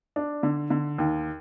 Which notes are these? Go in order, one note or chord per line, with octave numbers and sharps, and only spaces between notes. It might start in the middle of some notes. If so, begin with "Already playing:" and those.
D4
D3
D3
D#2